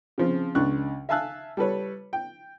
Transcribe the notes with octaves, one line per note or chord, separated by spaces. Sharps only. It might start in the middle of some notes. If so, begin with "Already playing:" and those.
C#3 F3 C4
C#2 D4 C#6 F#6
E5 F5 G#5 A5 E6 F#6
G3 A4 B4 C#5
G5